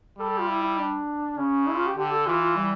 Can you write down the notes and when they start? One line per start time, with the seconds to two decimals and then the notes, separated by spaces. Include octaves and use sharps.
0.19 G3 A4
0.29 A4
0.38 F4
0.49 E4
0.63 E4
0.79 D4
1.37 C#3 C#4
1.68 E4
1.76 F4
1.86 G4
1.96 D3 G4
2.12 A4
2.27 E3 F4
2.41 F4
2.55 G3